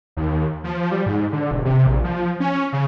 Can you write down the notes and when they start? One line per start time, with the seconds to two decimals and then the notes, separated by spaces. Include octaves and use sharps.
0.17 D#2
0.64 F3
0.91 G3
1.06 G#2
1.32 D3
1.51 E1
1.65 C3
1.87 A#1
2.04 F3
2.40 C#4
2.73 C#3